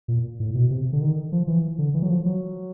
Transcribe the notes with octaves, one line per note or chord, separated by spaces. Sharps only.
A#2
A2
B2
C3
D3
D#3
F3
E3
D3
E3
F#3
F3
F#3